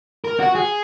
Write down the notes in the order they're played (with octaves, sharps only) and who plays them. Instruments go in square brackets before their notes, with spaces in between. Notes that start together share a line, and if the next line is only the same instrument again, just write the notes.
[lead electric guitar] A#4
F#4
G#4